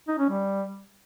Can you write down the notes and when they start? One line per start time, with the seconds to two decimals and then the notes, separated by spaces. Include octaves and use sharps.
0.08 D#4
0.19 C#4
0.30 G3